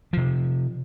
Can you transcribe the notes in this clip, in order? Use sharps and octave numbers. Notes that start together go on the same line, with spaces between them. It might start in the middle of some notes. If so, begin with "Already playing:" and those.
C3 F3